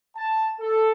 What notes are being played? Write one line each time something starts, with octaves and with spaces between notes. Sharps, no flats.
A5
A4